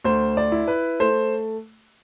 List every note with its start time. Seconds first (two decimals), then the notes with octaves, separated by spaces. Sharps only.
0.04 D2 C5
0.37 D5
0.52 E4
0.68 B4
1.00 A3 C5